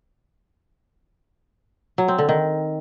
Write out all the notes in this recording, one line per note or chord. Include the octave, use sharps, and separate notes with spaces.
F#3
C4
D3
D#3